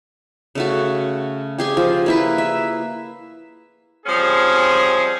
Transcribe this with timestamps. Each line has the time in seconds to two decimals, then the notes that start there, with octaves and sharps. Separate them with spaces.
0.55 C#3 A3 F#4
1.58 G4 G#4 G#5
1.77 F3
2.06 A#3 E4 B4
2.38 E5
4.06 F3 G3 C4 C#4 G#4